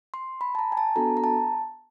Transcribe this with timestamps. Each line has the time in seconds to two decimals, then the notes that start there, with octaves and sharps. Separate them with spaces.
0.14 C6
0.41 B5
0.55 A5
0.59 A#5
0.72 G#5
0.77 A5
0.96 B3 D4 F#4 A4 A#5
1.17 A#5
1.24 A5